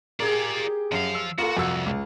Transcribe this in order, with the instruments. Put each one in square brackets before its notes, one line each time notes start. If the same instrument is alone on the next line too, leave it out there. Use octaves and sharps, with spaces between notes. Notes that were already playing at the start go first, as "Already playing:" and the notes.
[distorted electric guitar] F4 D5 [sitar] G4 G#4 A#4
[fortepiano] F#2 [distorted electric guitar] F3 F5
[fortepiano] E6
[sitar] A#3 [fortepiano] F4 A4 [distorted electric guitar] F#4
[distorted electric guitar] C2 [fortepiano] F2 F#4 E6
[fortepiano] C#2